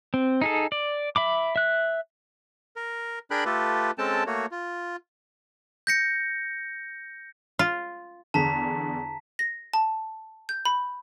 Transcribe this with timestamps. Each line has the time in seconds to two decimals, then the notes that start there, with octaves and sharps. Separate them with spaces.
0.14 C4
0.41 D#4 G#4 A4
0.72 D5
1.16 E5 B5 D6
1.56 E5 F#6
2.76 A#4
3.31 D4 G#4 A#4 G5 B5 F#6
3.45 A3 F4 G4 A4 B4
3.98 G#3 C4 C#4 A4 G5 A5
4.26 A3 A#3 F#4 C#5
4.51 F4
5.87 G6 A#6 C#7
7.59 F4
8.34 E2 D3 G#4 A5 A#5 B6
9.39 A#6
9.73 A5
10.49 G6
10.65 B5